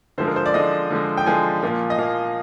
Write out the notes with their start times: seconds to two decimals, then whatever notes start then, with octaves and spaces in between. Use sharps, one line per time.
0.18 D3 F3 G#3 C5
0.27 A#4
0.36 C5
0.46 D5
0.53 D3 F3 G#3 D#5
0.90 D3 F3 G#3
1.17 G5
1.26 D3 F3 G#3 G#5
1.63 A#2 F3 A#3
1.90 D#5
1.98 A#2 F3 A#3 F5